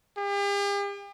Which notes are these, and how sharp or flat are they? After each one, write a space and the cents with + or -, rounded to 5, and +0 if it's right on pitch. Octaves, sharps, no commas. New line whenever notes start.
G4 +45